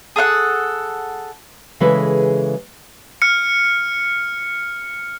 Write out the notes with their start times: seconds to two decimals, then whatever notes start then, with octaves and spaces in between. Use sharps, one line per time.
0.16 G#4 A4 F5 F#5
1.80 C#3 E3 G#3 G#4 A4 B4
3.22 F6 C#7